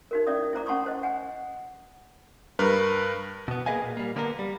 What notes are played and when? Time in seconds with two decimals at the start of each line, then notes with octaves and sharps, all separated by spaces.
0.11 D#4 F#4 A#4
0.27 C#4 E4 D5 E5 D#6
0.53 E4 C5 A#5 D6
0.66 C#4 F#5 A5 C6 C#6 D#6
0.86 C5 D#5
1.03 F#5 G#5
2.59 G2 A#4 B4
3.48 B2 B3
3.66 A#3 G#4 B4 D#5 F5 G#5
3.84 A#2
3.97 G3 A#3
4.16 D3 A#3 B3 D4 A#4
4.39 G3